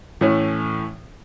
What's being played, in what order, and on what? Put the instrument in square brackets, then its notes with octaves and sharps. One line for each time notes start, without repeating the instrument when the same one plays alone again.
[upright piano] A2 E3 A3 C#4